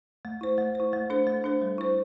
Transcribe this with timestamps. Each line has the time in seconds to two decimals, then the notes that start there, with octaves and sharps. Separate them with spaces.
0.25 A3
0.41 E4 C5
0.58 A3
0.75 E4 C5
0.93 A3
1.10 D4 A4 C5
1.27 A3
1.44 D4 A4 C5
1.62 G3
1.78 E4 C5